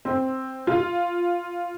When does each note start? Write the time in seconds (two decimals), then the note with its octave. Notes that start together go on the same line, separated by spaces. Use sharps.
0.05 C4
0.67 F4